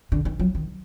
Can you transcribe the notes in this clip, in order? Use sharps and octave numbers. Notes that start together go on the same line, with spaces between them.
D3
D#3
F#3
D#3